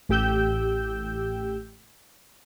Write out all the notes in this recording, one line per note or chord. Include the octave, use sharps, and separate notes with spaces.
A1 A2 G4 G5 E6 G6